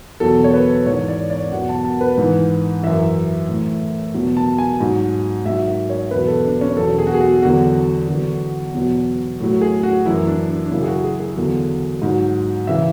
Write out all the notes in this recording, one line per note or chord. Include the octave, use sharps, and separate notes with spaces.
E2 B2 F#3 A4
C#5
B4
G#2 E3 C#5
D5
D5
E2 B2 F#3 F#5
A5
A5
B4
G#2 E3
F#2 E3 E5
A2 E3
E2 B2 F#3
A5
G#5
G#2 F#3
G#2 F#3 E5
E5
C#5
E2 B2 F#3 B4
A4
D4
C#4
E2 B2 F#3 A4
G#4
F#4
G#4
F#4
E2 D3 F#3 F#4
E2 D3 F#3
E2 B2 F#3
A2 F#3
G#4
F#4
F#2 E3 E4
D4
D4
D4
F#2 C#3 F#3 E4
G#4
F#4
G#4
G#4
E2 D3 F#3
G#2 F#3
C#3 E3 E5